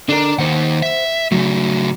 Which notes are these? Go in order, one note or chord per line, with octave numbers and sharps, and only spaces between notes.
D3 D4 A#4
D#2 D#3 C5 F#5
E5
C#3 F#3 A3